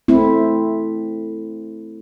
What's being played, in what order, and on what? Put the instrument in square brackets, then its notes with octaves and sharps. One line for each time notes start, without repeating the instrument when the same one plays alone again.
[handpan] A3 C4 E4